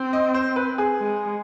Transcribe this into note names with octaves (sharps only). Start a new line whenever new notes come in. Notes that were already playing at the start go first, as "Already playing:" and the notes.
Already playing: C4
D#5
C5
B4
G#4
G#3